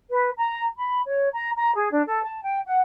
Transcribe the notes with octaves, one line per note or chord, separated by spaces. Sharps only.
B4
A#5
B5
C#5
A#5
A#5
G#4
D4
A4
A5
G5
F#5